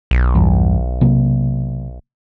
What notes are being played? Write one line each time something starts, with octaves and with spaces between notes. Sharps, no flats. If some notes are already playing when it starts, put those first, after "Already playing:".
B1
E2 G2
C3 F#3 A#3